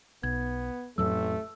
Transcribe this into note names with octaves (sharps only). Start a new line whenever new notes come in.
B1 B3 G#6
A1 F2 A2 F#3 A3 E6